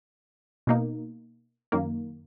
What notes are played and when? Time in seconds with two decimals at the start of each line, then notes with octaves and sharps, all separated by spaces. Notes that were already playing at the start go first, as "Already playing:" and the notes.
0.67 B2 A#3 D#4
1.72 F#2 D#3 A#3